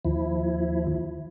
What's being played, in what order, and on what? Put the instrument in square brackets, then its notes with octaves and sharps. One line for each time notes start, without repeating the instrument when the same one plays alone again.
[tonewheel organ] D#2 F3 E4